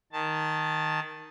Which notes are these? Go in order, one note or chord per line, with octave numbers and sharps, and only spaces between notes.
D#3 A5